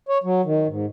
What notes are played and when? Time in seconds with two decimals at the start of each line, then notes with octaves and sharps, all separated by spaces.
0.09 C#5
0.24 F#3
0.45 D#3
0.67 G#2